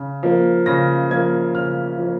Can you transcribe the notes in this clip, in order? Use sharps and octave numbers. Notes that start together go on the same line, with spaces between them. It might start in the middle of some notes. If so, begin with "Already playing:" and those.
Already playing: C#3
F3 A#3
C#3 A#6
F3 A#3 G#6
C#3 F6
F3 A#3